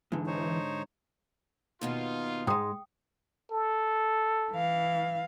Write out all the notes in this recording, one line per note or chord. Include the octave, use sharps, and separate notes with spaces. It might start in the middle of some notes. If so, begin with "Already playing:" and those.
G#2 D3 E3
D#4 C5 C#5
D#2 B2 B3 D#4 F4
G#2 G#3 G5 D#6
A4
E3 F5